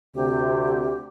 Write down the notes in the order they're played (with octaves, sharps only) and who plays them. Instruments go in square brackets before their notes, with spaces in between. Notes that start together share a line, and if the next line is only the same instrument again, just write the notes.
[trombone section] D2 C3 [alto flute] G4